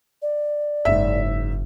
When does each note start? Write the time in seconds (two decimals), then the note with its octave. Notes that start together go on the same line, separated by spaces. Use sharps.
0.22 D5
0.85 F#1 G#2 E5